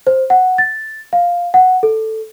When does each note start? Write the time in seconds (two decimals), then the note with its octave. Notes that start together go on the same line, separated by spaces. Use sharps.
0.07 C5
0.30 F#5
0.58 A6
1.13 F5
1.54 F#5
1.83 A4